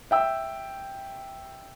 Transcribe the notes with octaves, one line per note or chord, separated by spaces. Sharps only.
E5 G5 E6